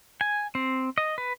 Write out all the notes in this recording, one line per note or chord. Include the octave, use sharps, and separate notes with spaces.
G#5
C4
D#5
B4